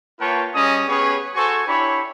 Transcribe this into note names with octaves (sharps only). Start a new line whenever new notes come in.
A#3 F4 B4 C#5 G5 A5
G3 C#4 G#4 D#5 D#6
B3 C#4 G4 G#4 B4 C#5
F#4 A4 C5 G#5 C#6
D4 E4 G4 C#5 B5